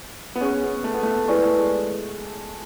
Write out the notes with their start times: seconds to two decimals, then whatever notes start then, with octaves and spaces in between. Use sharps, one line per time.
0.35 B3
0.41 C#4 G#4 C#5 F#5 C#6
0.63 B3
0.84 A3
0.94 B3
1.03 A3
1.28 G#3 E4 B4 D5 G#5 C#6
1.43 A3
1.57 G#3